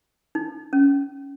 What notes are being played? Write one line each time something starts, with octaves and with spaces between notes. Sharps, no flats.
D#4
C#4